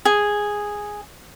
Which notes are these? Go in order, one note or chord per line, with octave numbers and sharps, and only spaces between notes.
G#4